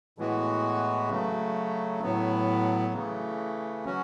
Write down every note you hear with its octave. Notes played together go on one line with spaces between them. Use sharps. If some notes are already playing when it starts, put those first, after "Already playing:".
A2 E3 G#3 B3 F#4
C#3 F#3 A3
A2 F#3 B3
C#3 E3 A3
F#3 C#4 F#4